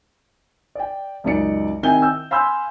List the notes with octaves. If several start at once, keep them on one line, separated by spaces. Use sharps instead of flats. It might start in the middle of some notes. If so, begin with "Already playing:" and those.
D5 G5
C#2 F#2 D#4 D5 C#7
C3 D#3 E4 G#5 G6 G7
E6 G6
F5 G#5 B5 C6 E6 G6